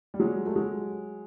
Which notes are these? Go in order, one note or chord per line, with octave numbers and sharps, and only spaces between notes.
G3
F#3 G#3
A3
F#3 G#3